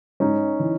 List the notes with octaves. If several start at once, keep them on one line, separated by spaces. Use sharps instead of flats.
G#2 C#4 D#4
E3